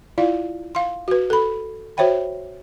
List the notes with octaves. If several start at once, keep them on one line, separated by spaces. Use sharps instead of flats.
E4 F4 D5 F5
F5 C6
F#4 B4
A4 B5
F#4 C5 C#5 E5 G5 B5